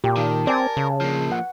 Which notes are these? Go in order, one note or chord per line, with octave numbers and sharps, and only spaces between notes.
A#2 G4
D#3 A5
C4 A#4 D5 G#5
C#3
F3 A#3
F#5